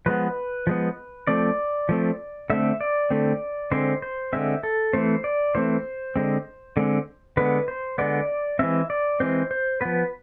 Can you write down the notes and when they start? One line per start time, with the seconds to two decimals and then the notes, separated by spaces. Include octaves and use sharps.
0.06 F3 G#3 B3 B4
0.67 F3 G#3 B3
1.27 F3 A3 C4 D5
1.89 F3 A3 C4
2.50 D3 A3 C4 E5
2.81 D5
3.11 D3 A3 C4
3.72 D3 G#3 C4 C5
4.02 C5
4.33 D3 G#3 C4 E5
4.63 A4
4.93 E3 A3 C4 C5
5.24 D5
5.55 E3 A3 C4 C5
6.16 D3 G#3 C4
6.77 D3 G#3 C4
7.37 D3 G#3 B3 B4
7.68 C5
7.98 D3 G#3 B3 D5
8.59 E3 G#3 C4 E5
8.90 D5
9.20 E3 G#3 C4 C5
9.51 C5
9.81 F3 B3 B4